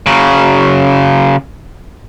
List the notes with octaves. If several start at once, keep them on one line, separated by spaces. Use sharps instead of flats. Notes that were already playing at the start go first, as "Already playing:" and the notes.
C#3 F#3